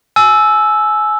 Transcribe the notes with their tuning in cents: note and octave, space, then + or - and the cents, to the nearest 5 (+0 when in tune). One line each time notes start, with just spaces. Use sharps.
G#5 +30 E6 +0